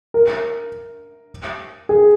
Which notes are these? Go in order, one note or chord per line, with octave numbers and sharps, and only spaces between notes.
A#4
G#4